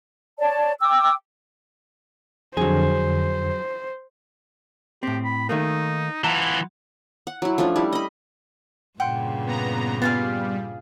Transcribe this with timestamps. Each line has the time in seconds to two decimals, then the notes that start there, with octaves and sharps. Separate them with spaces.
0.38 C#5 D5 A5
0.81 G5 D6 E6
2.57 F2 D3 F#3 G#4 C5
5.03 A2 C4 G4
5.24 B5
5.49 D#3 A3 A#3 D#4
6.24 E3 F4 E5 F#5 A5 A#5
7.27 F#5
7.42 F#3 E4
7.58 F3 A3 C#4 D4
7.76 G3 E4
7.93 D#5 B5
9.00 G2 A#2 C#3 F#5 G5 C6
9.46 B3 A#5
10.02 G3 B3 F4 G#4 F5